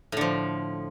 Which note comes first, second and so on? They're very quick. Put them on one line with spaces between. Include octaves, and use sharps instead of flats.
A2 D3 F3